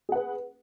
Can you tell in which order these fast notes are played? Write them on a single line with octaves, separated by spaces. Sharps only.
G#4 F#5 B4